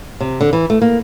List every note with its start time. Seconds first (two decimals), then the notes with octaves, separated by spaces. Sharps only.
0.20 C3
0.41 D3
0.53 E3
0.70 A3
0.82 A#3